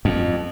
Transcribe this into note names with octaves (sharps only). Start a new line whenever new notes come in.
F2